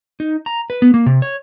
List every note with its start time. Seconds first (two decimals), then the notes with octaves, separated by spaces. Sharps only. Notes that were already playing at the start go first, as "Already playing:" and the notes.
0.20 D#4
0.46 A#5
0.70 B4
0.82 B3
0.94 A#3
1.06 C3
1.22 C#5